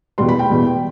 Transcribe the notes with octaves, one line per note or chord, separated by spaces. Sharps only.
E2 B2 G3 C6
B5
G5
E2 B2 G3